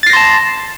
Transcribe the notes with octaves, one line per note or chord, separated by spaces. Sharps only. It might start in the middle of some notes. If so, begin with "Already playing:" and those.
A5 C6 A6 A#6 C7